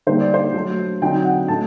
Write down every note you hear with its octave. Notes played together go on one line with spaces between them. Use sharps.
D3 G3 A#3 D#4 C5
D5
C5
F#3 A3 D4
D3 F#3 C4 D#4 G5
F#5
A2 A3 D4 A5